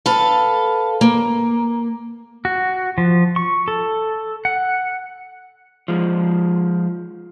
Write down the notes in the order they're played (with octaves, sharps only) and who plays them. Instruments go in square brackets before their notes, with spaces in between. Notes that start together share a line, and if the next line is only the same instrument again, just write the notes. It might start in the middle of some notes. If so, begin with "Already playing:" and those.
[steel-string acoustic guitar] A4 B4 F5
A#3
[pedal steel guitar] F#4
F3
C#6
A4
F#5
[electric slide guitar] F3 G#3